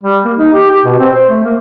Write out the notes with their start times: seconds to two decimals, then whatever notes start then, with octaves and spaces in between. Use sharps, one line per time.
0.03 G3
0.25 A#3
0.37 D#4
0.53 G4
0.70 G4
0.85 B2
0.99 C4
1.13 C5
1.29 A3
1.44 A#3